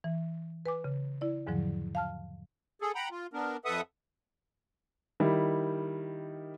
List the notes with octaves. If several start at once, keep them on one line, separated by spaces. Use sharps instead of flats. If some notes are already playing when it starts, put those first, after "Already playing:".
E3
B4 G#5 D6
C#3
E4 D5
E2 G#2 D3 F3 F#3
F5 A5 F6
G#4 A4
F#5 G5 A#5 B5
F4
B3 D4 A#4
F2 A4 B4 E5 F#5 D#6
D#3 G3 E4